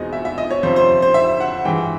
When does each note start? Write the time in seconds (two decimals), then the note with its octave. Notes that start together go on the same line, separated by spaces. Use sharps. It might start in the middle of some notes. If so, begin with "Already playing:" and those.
Already playing: E2 B2 G#3 C4 D#4 D#5
0.13 E5
0.25 E5
0.38 D#5
0.51 C#5
0.63 F2 C3 F3 C5
0.76 C5
1.02 C5
1.14 E5
1.40 F#5
1.65 G2 E3 G#3 G5